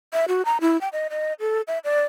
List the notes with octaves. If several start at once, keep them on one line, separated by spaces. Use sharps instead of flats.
E5
F#4
A#5
E4
G5
D#5
D#5
A4
E5
D5